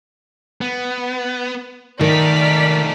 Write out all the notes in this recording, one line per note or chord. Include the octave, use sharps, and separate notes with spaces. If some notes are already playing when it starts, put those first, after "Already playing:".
B3
D#3 A3 D#4 D5 F6 B6